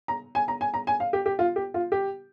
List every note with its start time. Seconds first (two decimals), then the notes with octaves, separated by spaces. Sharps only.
0.08 A#5
0.35 G#5
0.48 A#5
0.61 G#5
0.74 A#5
0.87 G#5
1.00 F5
1.13 G4
1.26 G4
1.39 F4
1.56 G4
1.74 F4
1.92 G4